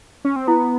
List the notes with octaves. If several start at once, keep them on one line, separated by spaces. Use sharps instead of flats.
C#4
C4
B3 E4